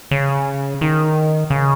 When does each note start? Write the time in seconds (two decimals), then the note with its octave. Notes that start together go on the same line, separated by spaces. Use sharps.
0.11 C#3
0.81 D#3
1.50 C#3